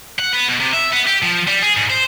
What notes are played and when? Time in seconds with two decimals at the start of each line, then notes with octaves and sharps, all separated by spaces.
0.19 F#5
0.33 B3
0.49 B2
0.60 C3
0.74 E5
0.93 B3
1.07 G4
1.22 F3
1.47 G3
1.62 G#4
1.76 G#2
1.90 C5